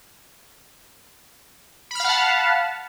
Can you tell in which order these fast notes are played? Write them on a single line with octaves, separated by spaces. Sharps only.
B5 F6 F5 F#5 A5